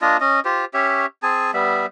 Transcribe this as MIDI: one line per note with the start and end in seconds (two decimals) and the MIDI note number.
0.02 0.17 58
0.02 0.17 62
0.02 0.17 65
0.02 0.17 75
0.21 0.40 61
0.21 0.40 75
0.45 0.65 65
0.45 0.65 67
0.45 0.65 72
0.74 1.06 61
0.74 1.06 67
0.74 1.06 73
0.74 1.06 76
1.23 1.51 60
1.23 1.51 68
1.23 1.51 80
1.23 1.51 81
1.54 1.86 55
1.54 1.86 59
1.54 1.86 76